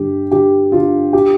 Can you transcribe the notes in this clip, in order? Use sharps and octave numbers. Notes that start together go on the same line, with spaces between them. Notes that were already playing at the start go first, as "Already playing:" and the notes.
Already playing: G2 D3 G4
D3 G4
D3 F4
G4